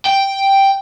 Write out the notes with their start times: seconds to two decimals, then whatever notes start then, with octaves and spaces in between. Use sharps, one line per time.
0.05 G5